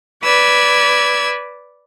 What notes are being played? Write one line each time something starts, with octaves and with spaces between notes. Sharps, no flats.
B4 D5 E6 G#6